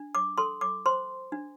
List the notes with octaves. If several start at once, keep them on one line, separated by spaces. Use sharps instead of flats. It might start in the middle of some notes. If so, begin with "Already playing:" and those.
Already playing: D4
D6
A4 C6
D6
C5 C6
D4